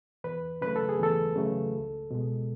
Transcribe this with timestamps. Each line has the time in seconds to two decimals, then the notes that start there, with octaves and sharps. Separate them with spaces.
0.24 E2 B4
0.61 C#3 F#3 A3 B4
0.76 A4
0.89 G#4
1.00 E2 A4
1.36 C#3 F#3 A3
1.74 C#2
2.11 B2 G#3